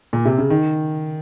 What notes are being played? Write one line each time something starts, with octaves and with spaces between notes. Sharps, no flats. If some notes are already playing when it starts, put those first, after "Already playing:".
A#2
C3
C#3
D#3